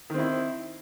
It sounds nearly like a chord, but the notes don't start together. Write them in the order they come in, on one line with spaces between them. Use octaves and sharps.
D#3 C4 E4